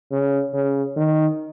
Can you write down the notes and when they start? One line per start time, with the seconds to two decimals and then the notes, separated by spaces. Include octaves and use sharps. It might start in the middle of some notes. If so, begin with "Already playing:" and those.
0.12 C#3
0.54 C#3
0.97 D#3